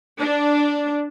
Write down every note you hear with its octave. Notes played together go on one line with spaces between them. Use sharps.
D4